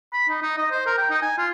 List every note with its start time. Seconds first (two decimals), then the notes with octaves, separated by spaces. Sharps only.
0.13 B5
0.29 D#4
0.42 D#4
0.58 D#5
0.71 C5
0.86 A#4
0.98 G5
1.10 D#4
1.22 G#5
1.38 F4